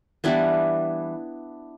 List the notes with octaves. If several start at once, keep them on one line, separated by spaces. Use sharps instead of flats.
E3 G3 B3 D4 E4